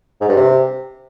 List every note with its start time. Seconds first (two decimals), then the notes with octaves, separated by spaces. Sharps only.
0.21 G#2
0.29 G2
0.37 C3